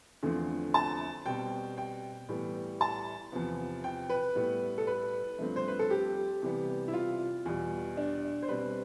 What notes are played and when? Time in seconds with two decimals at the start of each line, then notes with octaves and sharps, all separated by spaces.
0.23 E2 D3 F3 A3 C4
0.74 A5
1.26 B2 G3 C4 G5
1.77 G5
2.29 A2 E3 G3 B3
2.81 A5
3.32 E2 C3 F3 B3
3.84 G5
4.10 B4
4.35 A2 G3 B3
4.78 A4
4.87 B4
5.39 G2 F3 A3 C4
5.56 C5
5.68 B4
5.79 A4
5.91 G4
6.42 C3 E3 G3 B3
6.88 E4
6.94 F4
7.45 E2 B2 G3
7.97 D4
8.43 C5
8.48 B2 G3 C4 B4